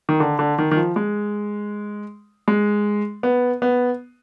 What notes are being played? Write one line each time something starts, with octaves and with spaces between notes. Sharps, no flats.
D#3
D3
D3
D#3
D#3
F3
G#3
G#3
B3
B3